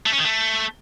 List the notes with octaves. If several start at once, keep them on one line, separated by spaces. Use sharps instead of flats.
A3
C#4
D#3
A3